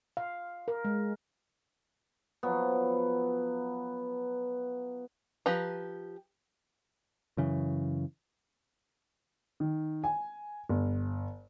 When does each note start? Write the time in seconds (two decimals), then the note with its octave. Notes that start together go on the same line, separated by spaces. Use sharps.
0.17 F5
0.68 A#4
0.85 G#3
2.43 F3 F#3 B3
5.46 F3 G4 B4 A#5
7.37 F#2 C#3 E3
9.60 D#3
10.04 G#5
10.69 G1